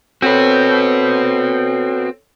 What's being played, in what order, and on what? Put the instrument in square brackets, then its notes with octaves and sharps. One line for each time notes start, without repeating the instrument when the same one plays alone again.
[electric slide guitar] C4 [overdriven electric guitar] F#4 B4 [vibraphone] A4 C#5